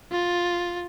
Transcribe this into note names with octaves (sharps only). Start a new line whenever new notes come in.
F4